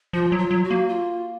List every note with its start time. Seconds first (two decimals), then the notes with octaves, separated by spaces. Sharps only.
0.13 F3 F4
0.32 F#3
0.38 F4
0.51 F#3
0.64 F#4
0.70 A#3
0.88 F4